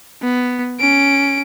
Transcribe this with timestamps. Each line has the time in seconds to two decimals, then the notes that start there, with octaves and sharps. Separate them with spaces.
0.22 B3
0.80 C#4 D7